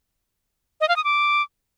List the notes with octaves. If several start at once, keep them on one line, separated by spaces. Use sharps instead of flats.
D#5
F5
D#6
D6